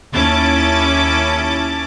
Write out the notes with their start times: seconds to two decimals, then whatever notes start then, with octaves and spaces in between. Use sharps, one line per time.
0.14 D#2 C#4 E4 A5 D6 A6